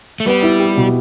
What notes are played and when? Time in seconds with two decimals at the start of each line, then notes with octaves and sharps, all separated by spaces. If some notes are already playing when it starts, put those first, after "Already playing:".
0.20 A3
0.26 G3 B3
0.43 E4
0.60 G4
0.77 B2